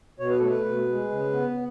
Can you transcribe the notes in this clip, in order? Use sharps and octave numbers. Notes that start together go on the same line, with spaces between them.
B2 C#5
B4
A3 A4
B4
B2
G#3
C#3
B3